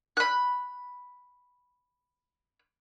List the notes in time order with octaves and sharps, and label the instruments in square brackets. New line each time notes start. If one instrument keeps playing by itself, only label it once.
[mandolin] B5 F#6